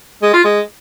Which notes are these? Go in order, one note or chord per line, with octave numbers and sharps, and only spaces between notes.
G#3
F4
G#3